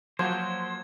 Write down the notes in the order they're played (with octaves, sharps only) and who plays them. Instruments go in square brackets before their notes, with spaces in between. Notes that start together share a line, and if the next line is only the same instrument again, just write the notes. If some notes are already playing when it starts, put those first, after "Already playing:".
[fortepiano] F3 F#4 [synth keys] F#3 A#3 [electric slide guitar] C5 [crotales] G#6